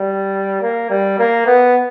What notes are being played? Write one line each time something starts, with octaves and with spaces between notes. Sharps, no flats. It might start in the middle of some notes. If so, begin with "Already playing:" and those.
Already playing: G3
A#3
G3
A#3
B3